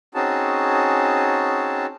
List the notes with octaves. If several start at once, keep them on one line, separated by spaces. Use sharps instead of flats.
C4 C#4 D#4 F#4 G#4 A5